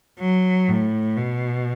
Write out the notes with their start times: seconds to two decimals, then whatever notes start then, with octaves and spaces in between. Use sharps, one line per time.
0.20 F#3
0.69 A2
1.18 B2